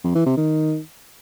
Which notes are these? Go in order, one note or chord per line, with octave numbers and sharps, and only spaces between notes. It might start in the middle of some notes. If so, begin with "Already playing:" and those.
F2
E3
C3
D#3